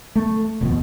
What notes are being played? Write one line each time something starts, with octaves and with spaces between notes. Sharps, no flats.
A3
D1 D#2 B2 F3